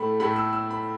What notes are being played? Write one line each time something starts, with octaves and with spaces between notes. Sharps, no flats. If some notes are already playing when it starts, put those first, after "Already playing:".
Already playing: A2 A3 B5
A2 A3 B5
E6
E6
B5